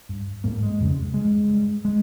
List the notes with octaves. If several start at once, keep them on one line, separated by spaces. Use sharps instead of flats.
G2
G#2 A#3
G#3
F2 C#3
G2 G#3
G2
G#3